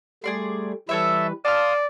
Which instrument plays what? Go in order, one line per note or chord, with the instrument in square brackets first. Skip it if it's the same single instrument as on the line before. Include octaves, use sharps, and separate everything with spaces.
[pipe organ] G3 A3 [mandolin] G#4 D5 C6
[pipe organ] E3 G3 B4 [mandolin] A4 C#5 E5
[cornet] D5 [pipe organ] F5 C6 D#6 [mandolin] A5 F6